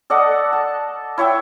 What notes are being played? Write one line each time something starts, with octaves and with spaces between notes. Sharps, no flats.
A4 D5 D#5 F#5
A5
E4 C#5 E5 G5